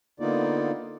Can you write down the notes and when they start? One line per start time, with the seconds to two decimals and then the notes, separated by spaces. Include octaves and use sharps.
0.20 D3 A#3 B3 D#4 F4 D5